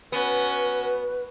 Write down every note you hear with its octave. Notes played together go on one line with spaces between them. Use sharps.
B3 C#4 F#4 B4